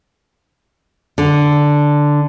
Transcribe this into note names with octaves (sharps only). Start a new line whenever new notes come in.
D3